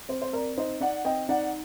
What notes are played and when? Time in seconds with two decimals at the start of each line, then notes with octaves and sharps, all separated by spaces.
0.09 C4 C5
0.22 C5
0.33 C4 A#4 D5
0.57 D#4 C5 D#5
0.81 D#4 D5 F#5
1.05 C4 D#5 G5
1.29 D#4 D5 F#5